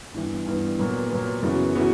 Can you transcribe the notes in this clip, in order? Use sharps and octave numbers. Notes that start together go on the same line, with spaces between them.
G2 E3 B3
G2 E3 B3
A#2 F#3 B3
A#2 F#3 B3
F#2 C#3 E3 B3 F#4
C#3 E3 B3 F#4